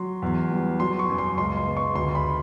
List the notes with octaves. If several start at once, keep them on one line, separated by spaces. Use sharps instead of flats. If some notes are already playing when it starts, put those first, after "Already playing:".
Already playing: F#3 C6
E2
G3
F#3 C6
C#6
F#2
C6
C#2 C6
C6
B3
C#6
D2 C6
B5